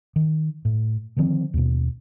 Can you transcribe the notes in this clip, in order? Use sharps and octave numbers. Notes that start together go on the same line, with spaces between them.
D#3
A2
D3 D#3 F3 C4
D#2 B2